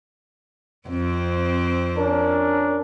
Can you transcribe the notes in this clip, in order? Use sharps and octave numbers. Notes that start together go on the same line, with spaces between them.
F2 C4
C#4 D4 A#4